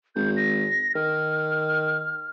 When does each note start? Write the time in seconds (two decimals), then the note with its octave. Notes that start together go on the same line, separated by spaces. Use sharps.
0.16 G#1 G6
0.36 A#6
0.95 D#3 F6